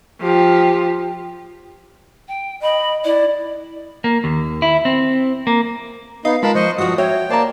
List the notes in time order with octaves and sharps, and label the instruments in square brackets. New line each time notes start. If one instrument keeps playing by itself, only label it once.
[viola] F3 G4
[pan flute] G5
[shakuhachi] D#5 [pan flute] B5
[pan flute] E4 [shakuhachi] D5
[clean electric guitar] A#3
D#2
E4
C4
A#3
[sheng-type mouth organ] B3 D#4 [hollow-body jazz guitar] D#5 [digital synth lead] F5
[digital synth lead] G#3 [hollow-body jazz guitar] F4 F5 [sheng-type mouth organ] A#4 A5 B5
[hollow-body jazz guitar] F3 [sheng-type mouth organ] C5 D#5 C#6
[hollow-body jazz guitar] G2 F3 [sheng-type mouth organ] F#4 [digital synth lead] D#6
[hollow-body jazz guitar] F#4 E5 [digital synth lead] C#5 [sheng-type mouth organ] G5
[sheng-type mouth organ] A#3 D5 A5 [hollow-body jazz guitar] C5 A#5